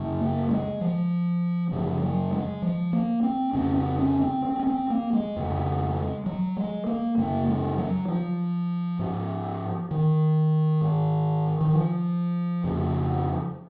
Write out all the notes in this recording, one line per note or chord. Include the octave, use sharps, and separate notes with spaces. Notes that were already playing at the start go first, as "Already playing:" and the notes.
Already playing: F#2 C#3
A#3
G#3
F3
F#2 C#3 F3
F#3
G#3
F3
A#3
C4
F2 C#3 C#4
C4
C#4
C4
C4
C#4
C4
A#3
G#3
F2 C#3
F#3
G#3
A#3
F#2 C#3 A#3
G#3
F#3
F3
G#2
D#3
G#2
D#3
F3
F2 C#3